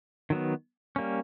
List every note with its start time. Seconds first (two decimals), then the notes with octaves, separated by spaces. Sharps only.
0.30 D#3 F#3 B3
0.96 G3 A#3 C#4